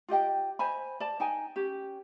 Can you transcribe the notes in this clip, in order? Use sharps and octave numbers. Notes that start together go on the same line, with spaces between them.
F4 G4 D#5 G5
C5 D#5 G#5 B5
D5 A5
D#4 G5 G#5
C#4 G4